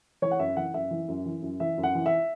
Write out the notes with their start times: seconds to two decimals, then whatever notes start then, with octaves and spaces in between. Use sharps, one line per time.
0.22 E3 C#5
0.31 F#5
0.39 F#2 E5
0.56 E3 F#5
0.74 F#2 E5
0.91 E3
1.08 F#2
1.26 E3
1.42 F#2
1.60 E3 E5
1.78 F#2
1.83 F#5
1.95 E3
2.06 E5